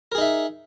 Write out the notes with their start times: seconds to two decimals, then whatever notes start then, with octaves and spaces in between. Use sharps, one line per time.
0.12 A#4
0.15 G#4
0.18 D#4
0.21 E5